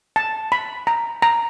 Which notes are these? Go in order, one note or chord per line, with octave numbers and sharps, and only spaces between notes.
A5
B5
A#5
A#5